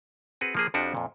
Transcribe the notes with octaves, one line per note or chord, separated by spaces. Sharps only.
C4 F#4 G#4 B4
F3 A#3 G#4
F2 F3 D4 F#4 G4
F2 A#2